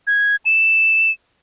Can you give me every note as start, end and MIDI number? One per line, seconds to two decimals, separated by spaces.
0.07 0.36 92
0.46 1.10 100